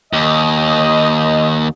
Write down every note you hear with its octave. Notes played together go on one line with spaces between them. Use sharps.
D#2 D#5